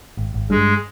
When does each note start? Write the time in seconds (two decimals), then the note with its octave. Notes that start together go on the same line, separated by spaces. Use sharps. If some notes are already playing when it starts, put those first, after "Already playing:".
0.17 G#1
0.34 G#1
0.50 G2 G#3